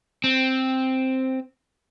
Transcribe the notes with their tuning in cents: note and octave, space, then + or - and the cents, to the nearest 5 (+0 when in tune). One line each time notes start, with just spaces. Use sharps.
C4 +0